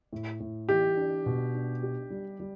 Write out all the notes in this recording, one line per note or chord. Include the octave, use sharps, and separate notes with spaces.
A2
A2
E3 G4
D4
B2
D4
G4
G3
G3